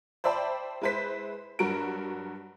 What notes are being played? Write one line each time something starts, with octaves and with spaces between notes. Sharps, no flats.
C5 D5 E5 G5 A5 B5
G#3 E4 B4 C5 B6
G2 F#3 F#4 A#4 D7